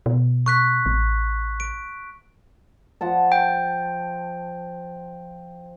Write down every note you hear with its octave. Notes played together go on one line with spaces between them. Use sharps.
B2
C#6 F#6 B6
A1
D7
F3 F#5 A5
G5